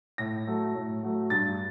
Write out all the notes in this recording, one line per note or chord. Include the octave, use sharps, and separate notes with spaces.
A2 A#6
F#3 A3
A2
F#3 A3
G2 A6